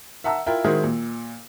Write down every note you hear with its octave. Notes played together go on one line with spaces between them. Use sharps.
E5 F#5 A5 A#5 E6
E4 F4 A#4 G5
D#3 G#3 E4 F#4 C5
A#2